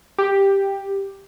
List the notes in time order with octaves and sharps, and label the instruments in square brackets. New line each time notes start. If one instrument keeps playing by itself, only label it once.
[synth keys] G4